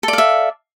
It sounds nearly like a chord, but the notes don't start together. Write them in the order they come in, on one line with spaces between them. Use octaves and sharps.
A4 D5 F5 E5